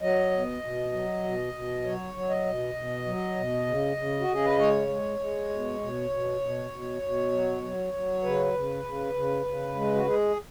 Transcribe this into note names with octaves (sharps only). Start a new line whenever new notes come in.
F#3 D#5
B2
B2
F#3
B2
B2
F#3 C#5
F#3
D#5
B2
B2
F#3
B2
C#3
C#3
F#4
C#3 G#4
B4
G#3 C#5
G#3
G#3
B2
B2
B2
B2
B2
B2
F#3
F#3
F#3
C#3 B4
C#3
C#3
C#3
C#3
G#3
F#4
G#3 G#4